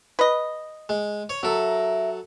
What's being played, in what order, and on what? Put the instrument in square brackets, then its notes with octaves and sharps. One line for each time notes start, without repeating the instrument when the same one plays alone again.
[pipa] B4 D#5
[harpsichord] G#3
C#5
[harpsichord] F#3 A4 [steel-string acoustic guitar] A#4 E5